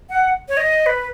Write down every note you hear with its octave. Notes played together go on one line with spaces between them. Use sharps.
F#5
C#5
D#5
B4